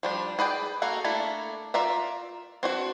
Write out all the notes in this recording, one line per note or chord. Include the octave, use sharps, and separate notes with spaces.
F3 G3 D4
G#4 B4 D5 G5
A#3 F#4 A4 F5
A3 A#3 D4 E4 A4
F4 A#4 D5 E5
C4 D4 F#4